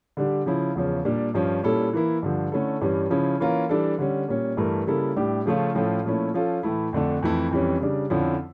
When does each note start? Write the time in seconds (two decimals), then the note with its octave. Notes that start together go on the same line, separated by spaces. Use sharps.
0.17 D3 G3 D4 G4
0.46 C#3 F3 C#4 E4
0.75 E2 C#3 F3 C#4
1.05 A#2 G3 D4 G4
1.34 G2 F3 C#4
1.63 A#2 G3 C#4 E4 A4
1.93 E3 A#3 E4
2.23 G2 D3 F3
2.52 D3 A3 C#4 E4 A4
2.81 G2 E3 G3 C#4
3.10 C#3 F3 C#4 E4
3.40 E3 A#3 C#4 F4 A#4
3.69 E3 G3 D4 A4
3.98 D3 G3 C#4
4.28 A#2 G3 C#4
4.57 G2 E3 A3 E4 A#4
4.87 C#3 G3 A#3 E4 A4
5.16 A2 G3 D4 G4
5.46 C#3 F3 A3 C#4 F4
5.75 A2 F3 C#4 F4 A4
6.04 A#2 F3 A3 C#4 E4
6.34 F3 C#4 F4 A4
6.63 A2 E3 A3 E4
6.93 F2 D3 A3 D4
7.22 F2 E3 A3 E4
7.51 F2 E3 G3 C#4
7.81 C#3 G3 D4
8.10 F2 D3 F3 C#4 E4